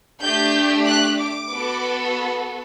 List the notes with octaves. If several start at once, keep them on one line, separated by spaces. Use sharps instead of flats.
A3 D4 G4 G6
F#6
D6
B3 F#4 A4